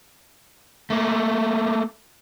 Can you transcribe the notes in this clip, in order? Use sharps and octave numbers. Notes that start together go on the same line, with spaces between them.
A3 A#3